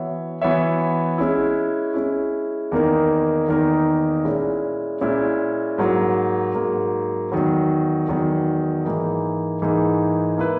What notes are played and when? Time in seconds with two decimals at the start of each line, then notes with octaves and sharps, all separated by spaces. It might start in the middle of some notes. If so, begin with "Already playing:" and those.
Already playing: E3 B3 F#4 C#5 E5
0.41 E3 B3 F#4 C#5 E5
1.18 G#3 C#4 E4
1.94 G#3 C#4 E4
2.72 E2 D#3 A#3 D#4 A#4
3.48 E2 D#3 A#3 D#4 A#4
4.25 A#2 G#3 C#4 E4
5.01 A#2 G#3 C#4 E4
5.78 G#2 F#3 A#3
6.55 G#2 F#3 A#3
7.32 E2 D#3 F#3
8.08 E2 D#3 F#3
8.85 G#2 E3 A#3 D#4
9.62 G#2 E3 A#3 D#4
10.38 A#3 E4 B4